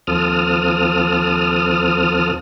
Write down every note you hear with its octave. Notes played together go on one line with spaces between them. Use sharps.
D#2 F3 C4 A4 D#6 F6